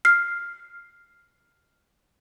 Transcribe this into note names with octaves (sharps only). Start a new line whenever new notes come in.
F6 C7